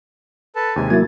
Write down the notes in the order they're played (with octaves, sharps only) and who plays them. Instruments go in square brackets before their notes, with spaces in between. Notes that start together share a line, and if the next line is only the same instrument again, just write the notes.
[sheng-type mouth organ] A4 B4 A5
[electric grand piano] D#2 C3 G#3 [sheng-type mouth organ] G#5
[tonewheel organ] F#3 A#3 E4 [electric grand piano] G#6 A6